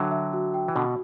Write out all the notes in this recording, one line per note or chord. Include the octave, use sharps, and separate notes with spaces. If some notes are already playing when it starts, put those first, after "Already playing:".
Already playing: D3 F#3 E5 G5
E5
F#4
G5
E3
B2 D3 F#4